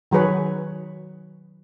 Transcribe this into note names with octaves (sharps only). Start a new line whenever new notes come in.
D#3 F#3 G#4 B4 C#5